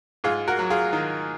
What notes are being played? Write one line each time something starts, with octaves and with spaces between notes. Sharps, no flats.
G#2 F4 G#4
F#4 A#4
F#3
F4 G#4
D#3